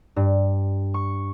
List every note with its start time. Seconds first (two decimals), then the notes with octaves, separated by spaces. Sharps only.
0.16 G2
0.94 C#6